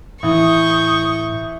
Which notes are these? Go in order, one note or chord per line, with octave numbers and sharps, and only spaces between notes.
A2 E3 C#6 D#6 G6